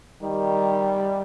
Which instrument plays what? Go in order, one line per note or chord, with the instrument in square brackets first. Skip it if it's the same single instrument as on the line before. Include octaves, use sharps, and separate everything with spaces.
[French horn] D#3 [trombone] G3